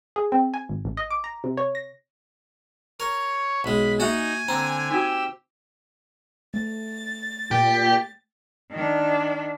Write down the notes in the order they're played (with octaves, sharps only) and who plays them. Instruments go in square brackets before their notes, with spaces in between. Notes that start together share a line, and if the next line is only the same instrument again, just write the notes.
[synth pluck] G#4
C4
G#5
G#1
A1
D#5
D6
A#5
C3
C#5
A#6
[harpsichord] A#4 [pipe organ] C#5
[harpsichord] B1 G#3 [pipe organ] B5
[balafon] A#3 E5 [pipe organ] D#4 [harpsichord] F#4 F#5 [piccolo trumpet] G#5
[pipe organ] D3 [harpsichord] C4 [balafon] A#5
[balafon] D#4 F#4 [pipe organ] G4 E6
[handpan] A3 [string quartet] A6
[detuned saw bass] A#2 [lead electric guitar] G4
[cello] D#3 D4